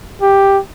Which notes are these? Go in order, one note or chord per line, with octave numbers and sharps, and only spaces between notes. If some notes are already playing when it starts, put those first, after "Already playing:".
G4